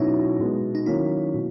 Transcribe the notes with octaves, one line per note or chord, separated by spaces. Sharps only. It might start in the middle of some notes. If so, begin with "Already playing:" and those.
Already playing: B2 F#3 C#4 D#4 E4
B2 G#3 B3
D#4
D#3 F#3 A#3 C#4 E4
B2